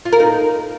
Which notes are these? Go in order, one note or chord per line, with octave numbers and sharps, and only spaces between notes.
F4
A#4
D#4